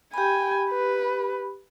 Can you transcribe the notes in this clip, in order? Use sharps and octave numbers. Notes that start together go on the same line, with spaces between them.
G4 G5 G#5 B5
B4